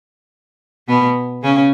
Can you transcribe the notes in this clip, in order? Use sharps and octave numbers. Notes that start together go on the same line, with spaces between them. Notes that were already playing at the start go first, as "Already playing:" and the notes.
B2 B3
C#3 C#4